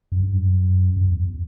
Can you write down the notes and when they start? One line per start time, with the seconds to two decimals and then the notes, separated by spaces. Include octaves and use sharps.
0.12 F#2
0.22 G2
0.32 F#2
0.96 F#2
1.11 E2